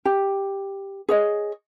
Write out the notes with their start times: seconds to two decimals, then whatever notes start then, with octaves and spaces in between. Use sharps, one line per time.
0.05 G4
1.09 G#4 C#5 D#5